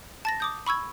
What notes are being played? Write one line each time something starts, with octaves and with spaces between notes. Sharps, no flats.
A5 A6 A#6
D6 D#6 G6
B5 C#6 E6 G#6